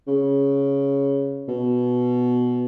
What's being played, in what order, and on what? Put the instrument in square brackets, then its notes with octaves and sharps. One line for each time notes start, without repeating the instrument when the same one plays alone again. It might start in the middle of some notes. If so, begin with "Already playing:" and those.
[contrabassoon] C#3
B2